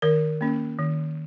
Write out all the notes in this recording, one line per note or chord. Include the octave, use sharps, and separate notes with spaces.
D#3 A#4
A#3 C#4
D#3